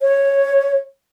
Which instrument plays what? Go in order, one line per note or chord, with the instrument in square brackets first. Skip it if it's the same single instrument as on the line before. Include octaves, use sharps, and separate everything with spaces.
[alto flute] C#5